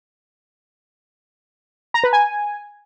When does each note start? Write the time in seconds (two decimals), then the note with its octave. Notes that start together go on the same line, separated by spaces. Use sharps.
1.94 A#5
2.04 B4
2.13 G#5